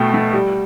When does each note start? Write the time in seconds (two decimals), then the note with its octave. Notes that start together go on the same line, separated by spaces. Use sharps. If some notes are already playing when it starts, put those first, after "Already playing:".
Already playing: B2 A3 G5
0.14 A3
0.33 G3